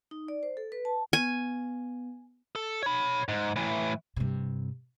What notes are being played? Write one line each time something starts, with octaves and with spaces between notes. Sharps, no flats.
D#4
D5
C5
A4
B4
A5
B3 G#5
A4
C#5 B5
G#2
A2 E3
G2 C3